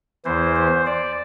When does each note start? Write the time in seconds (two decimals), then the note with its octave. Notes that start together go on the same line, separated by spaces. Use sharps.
0.25 E2 E3 C5
0.56 C5
0.86 D5